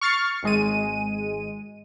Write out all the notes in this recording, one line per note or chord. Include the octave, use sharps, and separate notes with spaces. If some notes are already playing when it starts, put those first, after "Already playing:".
C#6 F6 A6 C7 C#7
G#1 G#3 D#7